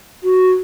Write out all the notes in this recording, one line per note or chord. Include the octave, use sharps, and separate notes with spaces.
F#4